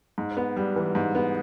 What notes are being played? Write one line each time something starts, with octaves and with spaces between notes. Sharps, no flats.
G#2
B3
G3
E3
G#2
B3